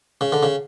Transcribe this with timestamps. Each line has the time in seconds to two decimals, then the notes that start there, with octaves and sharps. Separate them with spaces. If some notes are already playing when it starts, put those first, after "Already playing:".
0.21 C#3
0.32 D3
0.43 C#3